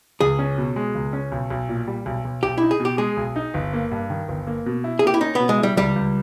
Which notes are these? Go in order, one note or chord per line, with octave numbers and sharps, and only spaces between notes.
C#2 G#4
C#4
B2
G#3
C#2
C#4
B1
B1
A#2
G3
B1
B1
B1 G4
D#4 E4
G#4
B2
G4
G#3 G#4
B1
D#4
G1
A#3
G2
D#3
G1
A#3
B2
E4
G#4
A#3 G4
E4
C#4 D#4
B2 B3
G#3
E4
G3
C#2 G3
C#2